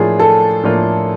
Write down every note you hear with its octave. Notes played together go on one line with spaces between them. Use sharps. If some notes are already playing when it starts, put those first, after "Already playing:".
Already playing: A2 F3 A#3 D4 F4 G#4
A4
A2 F3 A#3 D4 F4